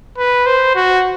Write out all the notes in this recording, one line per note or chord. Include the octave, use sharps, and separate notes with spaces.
B4
C5
F#4